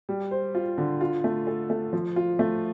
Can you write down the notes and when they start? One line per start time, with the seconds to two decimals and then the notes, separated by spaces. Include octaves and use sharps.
0.09 G3
0.31 C5
0.55 F4
0.78 D3
1.01 F4
1.24 A3
1.47 A4
1.70 A3
1.93 F3
2.16 F4
2.39 A3